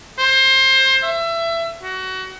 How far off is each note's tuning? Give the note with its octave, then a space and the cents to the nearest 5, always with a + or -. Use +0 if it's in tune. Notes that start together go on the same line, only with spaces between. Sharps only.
C5 +25
E5 +25
F#4 +25